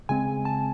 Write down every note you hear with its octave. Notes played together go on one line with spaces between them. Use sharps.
C#3 G#3 C4 G#5
A5